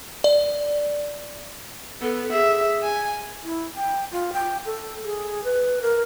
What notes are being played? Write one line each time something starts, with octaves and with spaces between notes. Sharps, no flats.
D5
B3 A4
G#4 E5
G#5
E4
G5
F4
G5
A4
G#4
B4
A#4